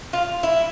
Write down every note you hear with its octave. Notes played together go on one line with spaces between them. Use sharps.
F4
E4